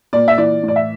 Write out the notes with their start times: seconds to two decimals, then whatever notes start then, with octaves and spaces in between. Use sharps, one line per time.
0.13 A#2 D5
0.28 E5
0.38 E3 D5
0.63 A2
0.68 D5
0.76 E5